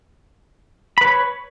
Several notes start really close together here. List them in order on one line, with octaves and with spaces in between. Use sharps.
B5 B4 C#5